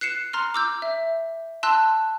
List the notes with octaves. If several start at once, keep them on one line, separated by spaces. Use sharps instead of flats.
F#6 C7 C#7 E7
A#5 C6 F6
D6 E6 G6
E5
A5 C6 E6 F#6